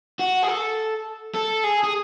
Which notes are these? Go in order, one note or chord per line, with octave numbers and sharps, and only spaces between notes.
F#4
G#4
A4
A4
G#4
G#4